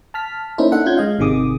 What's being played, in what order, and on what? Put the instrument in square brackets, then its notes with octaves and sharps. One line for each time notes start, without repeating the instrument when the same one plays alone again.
[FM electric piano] A5 F6 B6
A#3 C#4 D#4 E4 C5
D4 D#4 A4 E5 F#5
C#4 F4 G6 G#6
G#3 D#5 F5
G#1 C3 D#3 G#4 D6 D#6